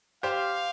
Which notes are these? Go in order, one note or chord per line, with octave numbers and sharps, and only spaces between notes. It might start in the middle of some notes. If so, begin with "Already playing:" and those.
G4 C5 F5